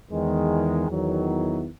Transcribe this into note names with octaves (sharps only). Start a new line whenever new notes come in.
E2 D#3 G#3
E2 D#3 F#3